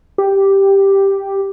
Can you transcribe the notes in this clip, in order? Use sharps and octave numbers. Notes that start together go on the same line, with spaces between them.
G4